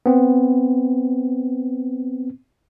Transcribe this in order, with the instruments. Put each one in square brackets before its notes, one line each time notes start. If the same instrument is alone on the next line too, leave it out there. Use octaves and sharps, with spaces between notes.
[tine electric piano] B3 C4